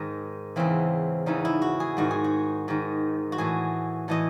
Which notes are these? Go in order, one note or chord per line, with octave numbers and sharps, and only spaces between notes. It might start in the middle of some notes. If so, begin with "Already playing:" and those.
Already playing: G#2 D#3
E2 C#3 E3 C4
E2 C#3 E3 D#4
E4
F#4
G#4
G#2 D#3 F#4
G#4
F#4
G#2 D#3
F#4
A2 E3 G#4
A2 E3 D#5